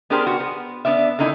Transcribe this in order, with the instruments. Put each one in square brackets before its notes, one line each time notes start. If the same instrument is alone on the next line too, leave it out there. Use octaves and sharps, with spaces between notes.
[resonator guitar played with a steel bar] B3 D4 G4 G#4 A#4 C5
F#4
B3
B3 D4 D5 E5
D3 A#3 D#4 E4 G#5